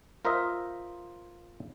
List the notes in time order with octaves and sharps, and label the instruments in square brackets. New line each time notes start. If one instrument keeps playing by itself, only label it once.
[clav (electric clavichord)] F4 A#4 C5 D#5 E5